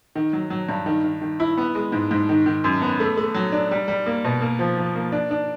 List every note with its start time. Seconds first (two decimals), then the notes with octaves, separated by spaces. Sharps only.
0.15 D#3
0.33 F#3
0.50 F#3
0.69 G2
0.86 D#3
1.04 D#3
1.22 D#3
1.40 E4
1.58 B3
1.75 G#3
1.92 G#2
2.11 G#2
2.29 D#3
2.46 D#3
2.64 F#2
2.82 B3
3.00 A3
3.17 A3
3.34 F#3
3.52 D4
3.71 G3
3.88 G3
4.06 A#3
4.24 B2
4.41 A#3
4.59 F3
4.77 F3
4.95 A#3
5.12 D4
5.31 D4